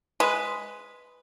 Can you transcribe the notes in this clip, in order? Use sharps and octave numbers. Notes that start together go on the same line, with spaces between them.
G#3 B4